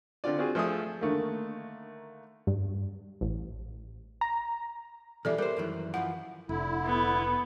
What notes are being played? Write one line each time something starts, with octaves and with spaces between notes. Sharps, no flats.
D3 C4 F4 D5
C4 F4 F#4 G#4
F3 A3 G#4 E5 D#6
D3 D#3 A3 A#3
G2
A1
A#5
B2 E3 G3 A4 D5 E5
G3 A#4 C5
F#2 D#3 E3
F#2 E3 F3 F#5
F1 D3 E4
B3